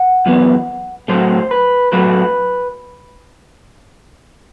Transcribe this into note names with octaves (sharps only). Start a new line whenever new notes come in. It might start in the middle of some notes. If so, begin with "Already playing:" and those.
Already playing: F#5
F#2 E3 B3
A2 F#3 A3 C5
B4
A2 F#3 A3 B4